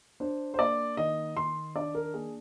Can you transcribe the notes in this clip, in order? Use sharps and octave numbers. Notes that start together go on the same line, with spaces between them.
D4 C5
C5
A#3 D5
D#3 D#5
D#3 C6
D4 D5
A#4
A#3 G#4